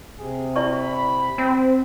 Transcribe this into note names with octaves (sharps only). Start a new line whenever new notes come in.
C3 G#4
E4 D5 B5 C#6
C4